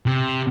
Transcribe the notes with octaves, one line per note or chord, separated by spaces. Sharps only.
C3